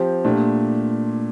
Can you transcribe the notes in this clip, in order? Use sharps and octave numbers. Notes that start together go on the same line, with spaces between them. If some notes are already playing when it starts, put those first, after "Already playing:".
Already playing: F3 C4 G4
A#2 A3 D4 G4